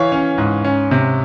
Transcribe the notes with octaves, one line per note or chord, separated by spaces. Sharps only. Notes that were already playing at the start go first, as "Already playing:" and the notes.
Already playing: E3 C#5 F5
C#4
G#2
C#4
C3